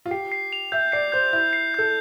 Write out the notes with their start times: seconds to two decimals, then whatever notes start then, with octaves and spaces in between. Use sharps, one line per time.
0.06 F4
0.11 G4 C7
0.32 C7
0.53 F7
0.72 E5 G6
0.92 D5 C7
1.12 C5 G6
1.33 E4 G6
1.53 C7
1.74 A4 G6